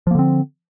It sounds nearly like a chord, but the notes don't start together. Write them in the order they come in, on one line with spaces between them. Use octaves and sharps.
F3 A#3 D3 C4